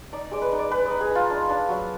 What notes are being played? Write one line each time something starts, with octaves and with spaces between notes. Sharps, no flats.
D#4 D5
G#3 D5
B4
D#4
D5
G#3 B4
D#5
D#4
G#4
D#4 F4
D4
D4
F#3